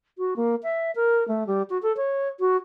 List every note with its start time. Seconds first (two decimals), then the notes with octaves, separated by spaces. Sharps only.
0.18 F#4
0.36 A#3
0.63 E5
0.96 A#4
1.28 A3
1.47 G3
1.70 F#4
1.82 A4
1.97 C#5
2.40 F#4